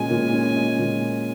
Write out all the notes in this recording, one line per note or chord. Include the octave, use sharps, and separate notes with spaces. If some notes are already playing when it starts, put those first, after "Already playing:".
Already playing: A#2 G#3 C#4 G#5
A#2
C#4
G#3
A#2